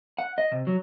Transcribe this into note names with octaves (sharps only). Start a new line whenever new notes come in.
F#5
D#5
C3
F#3